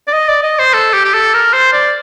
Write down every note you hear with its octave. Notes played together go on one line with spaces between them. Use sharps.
D5
D#5
D5
D#5
C5
A4
G4
G4
A4
A#4
C5
D5